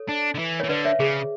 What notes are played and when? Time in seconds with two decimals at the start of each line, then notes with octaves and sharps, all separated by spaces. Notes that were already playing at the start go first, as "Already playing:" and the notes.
Already playing: A4 C#5
0.09 D4
0.35 D3
0.39 E3
0.60 E3 C#5
0.69 D3 B4 D5
0.85 C#5 E5
0.99 C#3 G#4